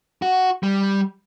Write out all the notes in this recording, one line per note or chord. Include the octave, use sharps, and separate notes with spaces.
F#4
G3